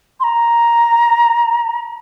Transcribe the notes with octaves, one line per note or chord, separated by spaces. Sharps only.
C6
A#5